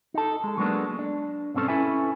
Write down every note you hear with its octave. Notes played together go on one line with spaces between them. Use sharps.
D#4 A4
G#3 A4
F#3 G#3 A#3 B3 D4 A4
D4
B1 G2 C4 C#4 A4
C#4 E4 A4 B4 E5 G#5